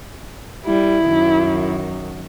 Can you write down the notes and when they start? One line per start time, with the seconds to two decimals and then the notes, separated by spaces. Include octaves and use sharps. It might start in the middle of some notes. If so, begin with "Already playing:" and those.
0.65 G3 E4
1.07 F#2 D#3